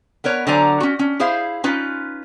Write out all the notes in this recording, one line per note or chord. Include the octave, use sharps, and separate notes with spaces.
B3 A#4 B4 C#5
D3 F#3 C5 D5 G#5 A#5
C#4 F#4
C#4
E4 G#4 C5 E5 F5
C#4 D#4 F4 B4